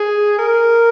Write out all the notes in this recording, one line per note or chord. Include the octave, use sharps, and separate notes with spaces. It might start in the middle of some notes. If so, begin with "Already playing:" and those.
Already playing: G#4
A#4